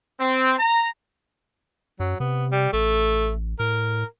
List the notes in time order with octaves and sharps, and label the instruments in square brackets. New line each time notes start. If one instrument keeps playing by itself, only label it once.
[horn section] C4
A#5
[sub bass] F#2 [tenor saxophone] F#3
[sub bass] C3 [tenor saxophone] B3
[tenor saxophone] G3
[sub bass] A1 [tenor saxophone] A3
[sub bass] A2 [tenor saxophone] A#4